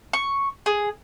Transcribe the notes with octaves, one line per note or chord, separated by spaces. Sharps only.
C#6
G#4